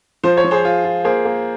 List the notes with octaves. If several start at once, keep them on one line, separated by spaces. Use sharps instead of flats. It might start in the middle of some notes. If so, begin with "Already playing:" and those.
F3 C5
C#5
F3
G#4 C5
F4
F4
A#3 G#4 C5
A#3